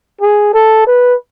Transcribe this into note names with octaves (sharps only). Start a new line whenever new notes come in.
G#4
A4
B4